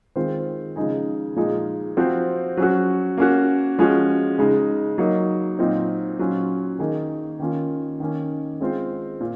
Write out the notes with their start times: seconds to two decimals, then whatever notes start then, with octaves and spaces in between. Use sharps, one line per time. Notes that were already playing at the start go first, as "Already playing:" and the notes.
0.16 D#3 G#3 C4 F4 C5
0.76 C#3 F3 G#3 D#4 G#4
1.36 A#2 F3 G#3 D#4 G#4
1.97 F3 C4 F#4 C5
2.57 F#3 C#4 F#4
3.17 A#3 C#4 F#4
3.78 F3 G#3 C#4 F#4
4.38 C#3 G#3 D#4
4.98 F#3 A#3 D#4
5.59 A#2 F#3 C4 D#4
6.19 A#2 F#3 C#4 F4
6.79 D#3 A#3 D#4 G#4
7.40 D#3 A#3 C#4 F4
8.00 D#3 A#3 C#4
8.60 G#3 C4 F4 C5
9.21 A#2